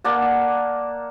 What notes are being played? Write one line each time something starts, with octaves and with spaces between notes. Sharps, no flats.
A#3 D5 F#5 A5